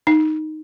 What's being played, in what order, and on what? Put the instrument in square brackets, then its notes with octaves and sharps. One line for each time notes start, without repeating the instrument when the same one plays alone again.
[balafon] D#4